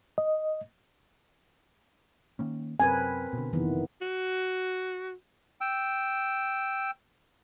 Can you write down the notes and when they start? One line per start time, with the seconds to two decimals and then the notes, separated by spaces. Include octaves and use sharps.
0.18 D#5
2.39 D#3 A#3 C#4
2.80 F#2 C3 C4 A#4 B4 G#5
3.33 B2 D3
3.53 F#1 C3 D#3 E3 B3
4.01 F#4
5.61 G5 E6